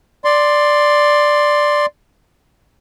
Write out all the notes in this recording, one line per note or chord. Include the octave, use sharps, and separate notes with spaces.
D5 C6